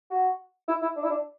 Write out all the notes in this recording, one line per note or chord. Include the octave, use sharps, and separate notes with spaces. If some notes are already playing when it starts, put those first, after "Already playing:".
F#4
E4
E4
D4
E4
D4